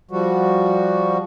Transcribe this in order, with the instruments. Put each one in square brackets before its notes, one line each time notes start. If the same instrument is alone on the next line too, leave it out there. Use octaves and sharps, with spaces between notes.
[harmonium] F3 G3 F#4